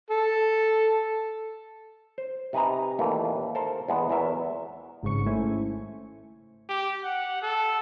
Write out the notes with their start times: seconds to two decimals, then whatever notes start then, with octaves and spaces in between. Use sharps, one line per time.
0.10 A4
2.18 C5
2.53 C3 D#4 B4 G#5 A#5
2.99 D#2 A#2 E3 A3
3.55 A4 A#4 C5 A5
3.88 E2 G#3 B3
4.09 E2 F#3 A#4 E5
5.03 G#1 G#2 C#3 C#6 C#7
5.26 A3 C#4 E4 C5 E5 G#5
6.69 G4
7.04 F#5
7.42 A4